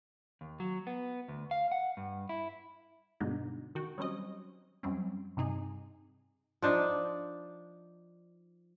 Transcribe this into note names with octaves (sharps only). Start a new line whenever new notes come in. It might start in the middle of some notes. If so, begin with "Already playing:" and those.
D#2
F#3
B3
D2
F5
F#5
G2
E4
G2 B2 D3 G#3 B3 D#4
D#3 F#4 G5
F#3 G3 C4 C#4 D#5
F#2 G3 C4 C#4
G2 C3 D#4 G#4
F3 D4 D#4